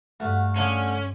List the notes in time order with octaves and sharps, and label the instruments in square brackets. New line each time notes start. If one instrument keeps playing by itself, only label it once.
[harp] G2 F6 [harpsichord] A3 [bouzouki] F#4
[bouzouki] D3 F4 G#4 [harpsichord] A3 [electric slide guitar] C#4 [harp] C6 D6